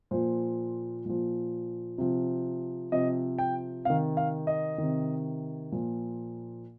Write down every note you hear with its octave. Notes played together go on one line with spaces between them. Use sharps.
A#2 F3 C5
A#2 F3
C3 F3
C3 F3 D#5
G5
C3 D#3 F5
F5
D#5
D#3
C3
A#2 F3